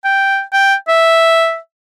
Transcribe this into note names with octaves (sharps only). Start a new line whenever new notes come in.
G5
G5
E5